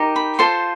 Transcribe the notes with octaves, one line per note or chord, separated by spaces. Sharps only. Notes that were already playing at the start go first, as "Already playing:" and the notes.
Already playing: D#4 G4 A#4
B5
F4 A4 C5 C6